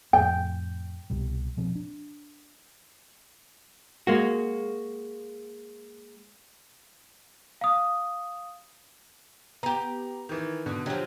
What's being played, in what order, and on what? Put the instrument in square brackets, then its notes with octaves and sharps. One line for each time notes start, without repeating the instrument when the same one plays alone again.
[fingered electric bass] F2 A2 [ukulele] G5
[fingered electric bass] C2 B2 G3
B2 F3 C4
D4
[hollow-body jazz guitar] G#3 A#3 F#4
[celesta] F5 D#6
[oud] B3 G4 [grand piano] A#5
[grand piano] D#3 E3
B2 D3
[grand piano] D3 G4 [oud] F3 F#3